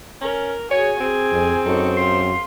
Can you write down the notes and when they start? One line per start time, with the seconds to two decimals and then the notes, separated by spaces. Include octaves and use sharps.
0.21 C#4 A#4
0.71 F#4 G#4 C#5 G#5
1.00 C4 G#4
1.32 F2
1.66 F#2 D#4 A4 C#6
1.97 F4 C6